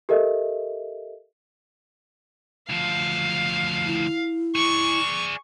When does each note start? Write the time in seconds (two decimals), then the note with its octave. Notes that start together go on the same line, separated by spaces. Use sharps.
0.09 G4 A4 A#4 D#5 E5
2.70 D2 F3 F5
3.86 E4
4.56 G#4 D5 C#6